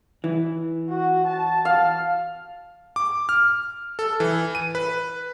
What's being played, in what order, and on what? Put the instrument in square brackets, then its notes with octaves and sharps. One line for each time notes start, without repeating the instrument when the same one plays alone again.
[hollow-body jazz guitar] E3
[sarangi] F#4
A5
[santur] F5
[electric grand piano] D6
F6
A4
E3
D#7
B4